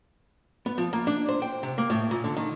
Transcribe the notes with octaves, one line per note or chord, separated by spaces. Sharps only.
B3
F3
A#3
D4
C5
G5
C3
A#3
A2
A#2
D3
D#3